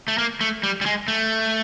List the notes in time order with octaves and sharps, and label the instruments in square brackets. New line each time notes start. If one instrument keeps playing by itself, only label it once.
[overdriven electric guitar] A3
A#3
A3
G3
G3
G#3
A3